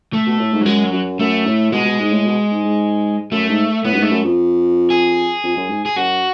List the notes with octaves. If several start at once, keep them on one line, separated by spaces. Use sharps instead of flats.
A3
B2
A2
G#2
F#3
F#2 G#3
F#3
F#2
F#2 A3
A2
B2 G#3
B2
G#2
A2
B2
G#2
G#2
F#2 A3
G#2
A2 B3
F#2
G#2 A3
F#2
F2
G#4
F2
F#2
G#2
G#4
F#2 F#4